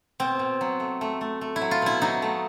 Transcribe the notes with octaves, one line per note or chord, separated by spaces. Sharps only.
B2 C4
B2
F#3
A3
A3
A3
A3
E4
F#3
F4
B2 E4
F#3 D#4
A3